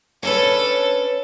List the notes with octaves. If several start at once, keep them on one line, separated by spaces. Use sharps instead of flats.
C#4 D4 A4 B4 C#5